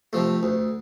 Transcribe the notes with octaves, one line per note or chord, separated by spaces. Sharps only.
C3 F3 A3
D2